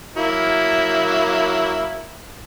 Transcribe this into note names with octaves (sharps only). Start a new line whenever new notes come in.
F#3 A#3 E4